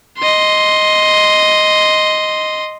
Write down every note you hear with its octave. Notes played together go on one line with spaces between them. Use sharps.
D#5 C6